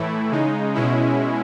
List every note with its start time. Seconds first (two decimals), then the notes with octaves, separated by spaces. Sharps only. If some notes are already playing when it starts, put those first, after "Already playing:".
Already playing: A2 E3 A3 E4
0.31 C#3 G#3 D#4
0.74 B2 G#3 C#4 E4